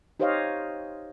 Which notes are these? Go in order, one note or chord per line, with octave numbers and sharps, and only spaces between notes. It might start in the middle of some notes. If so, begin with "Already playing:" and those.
D#4 G4 C5 C#5 D#5 F5